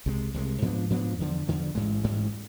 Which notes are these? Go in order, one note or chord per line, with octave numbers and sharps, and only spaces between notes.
C2 C3 G#3
C2 C3 G#3
G#2 F3 B3 D4
G#2 F3 B3 D4
E2 D3 F3
E2 D3 F3
A1 G#2 G#3
A1 G#2 G#3